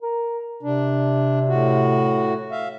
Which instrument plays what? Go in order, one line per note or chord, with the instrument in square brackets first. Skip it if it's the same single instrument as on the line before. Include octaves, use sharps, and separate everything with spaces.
[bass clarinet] A#4
[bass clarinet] C3 [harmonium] D4
[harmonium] A2 F#4
E5 F5